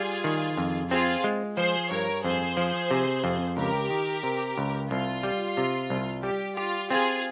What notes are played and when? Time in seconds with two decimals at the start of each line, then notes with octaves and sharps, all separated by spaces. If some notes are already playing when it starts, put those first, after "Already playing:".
Already playing: G3 F4 G#4
0.24 D#3
0.57 F2
0.91 C4 F4 G#4
1.24 G#3
1.57 F3 G#4 C5
1.91 G2 A#4 C#5
2.24 F2 G#4 C5
2.57 F3
2.91 C3
3.24 F2
3.57 C#2 G4 A#4
3.90 D#3
4.23 C3
4.58 C#2
4.91 C2 F4
5.23 G3
5.57 C3
5.90 C2
6.23 G3 G4
6.57 F4 G4
6.90 C4 F4 G#4